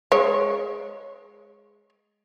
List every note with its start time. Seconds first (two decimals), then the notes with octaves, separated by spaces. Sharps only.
0.12 G#3 C#5